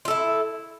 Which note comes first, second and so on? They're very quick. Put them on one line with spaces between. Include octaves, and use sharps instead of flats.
F4 A4 E4